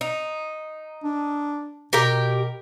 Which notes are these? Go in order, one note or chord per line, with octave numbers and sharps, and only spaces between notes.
D#4
D4
B2 G4 A#4 G5